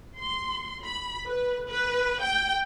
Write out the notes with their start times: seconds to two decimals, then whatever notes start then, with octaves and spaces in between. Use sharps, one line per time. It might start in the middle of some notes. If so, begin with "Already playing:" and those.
0.18 C6
0.85 B5
1.26 B4
1.67 B4
2.22 G5